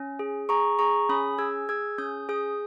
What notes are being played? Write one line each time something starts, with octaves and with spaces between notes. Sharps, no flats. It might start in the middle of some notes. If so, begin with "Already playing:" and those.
Already playing: C#4
G#4
G#4 A#5 C#6
G#4 A#5 C#6
C#4 B5 D#6
G#4 E6 G#6
G#4 E6 G#6
C#4 D#6 G6
G#4 D#6 G6